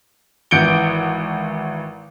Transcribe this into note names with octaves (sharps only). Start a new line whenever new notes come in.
G#1 E3 G6 C#7 D7 G7